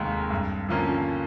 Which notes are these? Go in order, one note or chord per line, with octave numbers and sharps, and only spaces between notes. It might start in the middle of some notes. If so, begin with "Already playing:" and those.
Already playing: F1 D#2 D#3 G#3
G2
D3 F3 A#3 C#4